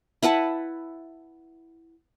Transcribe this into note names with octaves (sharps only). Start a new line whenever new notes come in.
E4 B4 F#5 A5